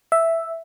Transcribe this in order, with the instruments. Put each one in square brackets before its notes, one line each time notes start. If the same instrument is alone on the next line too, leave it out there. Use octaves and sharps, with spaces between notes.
[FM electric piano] E5